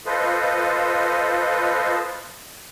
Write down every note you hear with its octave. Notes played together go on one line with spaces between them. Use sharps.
F4 A4 B4 C5 D#5